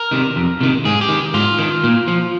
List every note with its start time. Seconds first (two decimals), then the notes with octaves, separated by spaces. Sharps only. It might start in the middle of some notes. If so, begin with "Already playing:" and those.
Already playing: A#4
0.11 C3 D#3
0.36 F2
0.61 C3 D#3
0.85 G#2 G#4
1.01 G4
1.09 D#3
1.34 G#2 F4
1.59 D#3
1.84 A#2
2.08 F3